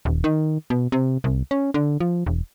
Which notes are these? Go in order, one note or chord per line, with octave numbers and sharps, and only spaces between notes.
D#1
D#3
B2
C3
C2
C#4
D3
F3
E1